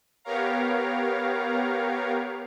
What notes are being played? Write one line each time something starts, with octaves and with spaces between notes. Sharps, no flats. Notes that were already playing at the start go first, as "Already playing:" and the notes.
B3 G4 A#4 C#5 F5 A#5